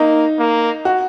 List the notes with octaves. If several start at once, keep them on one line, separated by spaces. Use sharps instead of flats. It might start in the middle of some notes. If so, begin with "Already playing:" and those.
Already playing: A#3 D#4
A#3
F#4